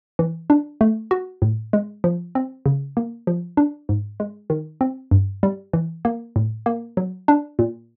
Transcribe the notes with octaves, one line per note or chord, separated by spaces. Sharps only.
E3
D4
A3
F#4
A2
G#3
F3
C4
C#3
A#3
F3
D4
G#2
G#3
D#3
C4
G2
G3
E3
A#3
A2
A#3
F#3
D4
A#2